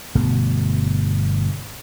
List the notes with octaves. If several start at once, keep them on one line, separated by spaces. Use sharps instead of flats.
G1 B2 A3